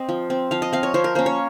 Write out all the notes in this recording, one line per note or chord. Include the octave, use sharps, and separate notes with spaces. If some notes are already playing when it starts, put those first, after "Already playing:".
Already playing: C4 D#5
F3
C4
F3 F5
D#5
C4 F5
C#5
F3 C5
A#4
A#3 C#4 C5
C#5